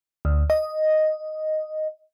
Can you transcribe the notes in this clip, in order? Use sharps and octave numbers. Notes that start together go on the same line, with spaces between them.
D2
D#5